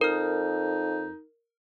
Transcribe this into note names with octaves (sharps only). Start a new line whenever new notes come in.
F2 D#4 A#4 F6